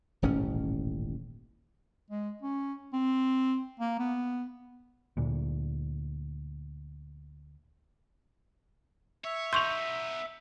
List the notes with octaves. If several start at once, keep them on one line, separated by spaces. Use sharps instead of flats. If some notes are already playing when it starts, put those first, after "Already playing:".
D#1 A1 G#2 C#4
G#3
C#4
C4
A#3
B3
D2 A#2
C#5 E5
B3 D#4 C6 C#6 G6 F7